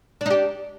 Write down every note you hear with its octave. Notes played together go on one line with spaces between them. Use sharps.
D4 D#4 G4